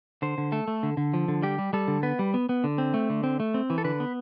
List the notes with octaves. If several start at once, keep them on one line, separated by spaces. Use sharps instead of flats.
D3 C5
D3
A3 A4
A3
D3
D3
F3
D3
G3 G4
G3
G3 A4
D3
B3 B4
G3
B3
B3
D3
C4
A3
D3
C4
A3
C4
E3
A4
D3 B4
B3